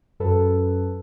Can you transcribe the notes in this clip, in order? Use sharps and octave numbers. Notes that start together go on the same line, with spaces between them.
F#2 A4 B4